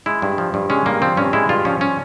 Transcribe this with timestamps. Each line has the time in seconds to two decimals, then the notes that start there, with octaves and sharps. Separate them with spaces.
0.06 G#3 E4
0.22 G2
0.38 F3
0.54 G2
0.70 G#3 C#4
0.86 G2 A#3
1.02 F3 C4
1.17 G2 C#4
1.33 G#3 E4
1.49 G2 F4
1.65 F3 C#4
1.81 C#4